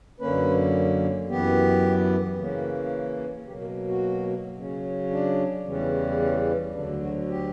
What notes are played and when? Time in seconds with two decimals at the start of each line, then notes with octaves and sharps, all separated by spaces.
0.20 F#2 D3 A#3 C#4 B4
1.29 F#2 E3 B3 G4
2.38 C#3 E3 A#3 C#4
3.47 B2 F#3 A#3 G4
3.61 A#4
3.88 F#4
4.56 C#3 F#3 C#4
5.10 D4
5.65 E2 C#3 E3 G3 C#4
6.19 C#4
6.74 D2 D3 F#3 D4
7.01 F#4
7.29 G4